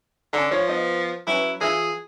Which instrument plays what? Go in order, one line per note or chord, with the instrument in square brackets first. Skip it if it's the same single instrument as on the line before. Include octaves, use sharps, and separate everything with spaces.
[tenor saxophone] D3 [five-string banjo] C#4 A#5
[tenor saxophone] F3 [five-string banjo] C#5
[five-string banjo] B3 D#5
[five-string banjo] F#3 C#4 B4 [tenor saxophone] E4
[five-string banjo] E3 E4 F4 [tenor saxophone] G#4